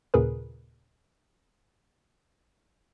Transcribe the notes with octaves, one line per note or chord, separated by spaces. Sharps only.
D#2 A#2 C#3 G#4 A#4 B4